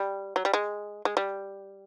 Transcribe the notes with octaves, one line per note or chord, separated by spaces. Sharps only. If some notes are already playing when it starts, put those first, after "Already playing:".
Already playing: G3
F#3
G3
G#3
G#3
G3